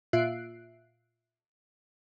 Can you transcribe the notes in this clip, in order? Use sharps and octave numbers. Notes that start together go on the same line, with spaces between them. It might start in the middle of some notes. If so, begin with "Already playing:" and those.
A#2 F4 E5 F#6 C7 D7